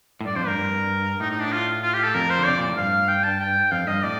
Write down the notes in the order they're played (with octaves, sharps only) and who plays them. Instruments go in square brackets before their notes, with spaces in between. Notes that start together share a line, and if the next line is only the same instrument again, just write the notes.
[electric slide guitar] A2
[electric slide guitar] G2 [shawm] D5
[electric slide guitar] F2 [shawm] C5
[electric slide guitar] G2 [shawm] A#4
[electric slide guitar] G2
[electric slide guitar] A2 [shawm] D#4
[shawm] D#4
D4
F4
F4
G4
A4
[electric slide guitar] F2 [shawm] A#4
[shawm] C5
[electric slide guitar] D3
[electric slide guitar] C3 [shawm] D5
[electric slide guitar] A#2
A2
[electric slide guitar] G2 [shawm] F5
[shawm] G5
A5
G5
[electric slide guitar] F2 [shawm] F5
[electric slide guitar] G2 [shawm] D#5
[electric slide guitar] A2 [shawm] D5